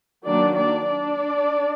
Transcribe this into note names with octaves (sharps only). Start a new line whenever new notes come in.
D#3 F#3 A#3 D4 D5
D4 D5
D4 D5